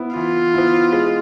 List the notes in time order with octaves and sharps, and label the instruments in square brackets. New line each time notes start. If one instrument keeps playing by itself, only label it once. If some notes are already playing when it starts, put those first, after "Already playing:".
Already playing: [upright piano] B3 E4
[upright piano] E3 [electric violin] F4
[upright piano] B3 E4
G#3